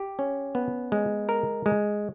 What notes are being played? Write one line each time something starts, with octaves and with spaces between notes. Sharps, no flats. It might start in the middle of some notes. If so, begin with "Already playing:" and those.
Already playing: G4
C#4
B3
G#3
A#4
G#3